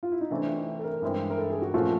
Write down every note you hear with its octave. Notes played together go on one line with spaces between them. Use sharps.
F4
E4
D#4
C3 E3 A3 C4 D4
A4
A#4
G2 E3 G#3 C4 E4
A#4
A4
G#4
F#4
A#2 F3 A3 C#4 F4 F#4